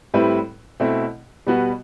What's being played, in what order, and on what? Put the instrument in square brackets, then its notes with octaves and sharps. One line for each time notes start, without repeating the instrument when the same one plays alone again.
[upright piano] A2 G3 C4 E4 B4
B2 A3 C4 E4
B2 G3 B3 F#4 B4